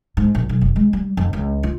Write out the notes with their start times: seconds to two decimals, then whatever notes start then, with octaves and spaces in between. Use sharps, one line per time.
0.17 G#2
0.35 A#1
0.49 B1
0.61 F1
0.76 G#3
0.93 G3
1.17 F2
1.33 C#2
1.63 F4